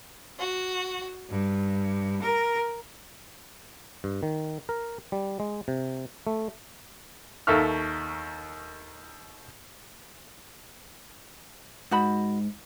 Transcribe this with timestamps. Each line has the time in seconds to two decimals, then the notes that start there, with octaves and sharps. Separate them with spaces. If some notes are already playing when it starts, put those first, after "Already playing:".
0.38 F#4
1.30 G2
2.21 A#4
4.04 G2
4.23 D#3
4.69 A#4
5.12 G3
5.40 G#3
5.68 C3
6.27 A3
7.47 D#2 A4 A#4 E5 C#6 F6
11.91 G#2 D#4 F#4 B5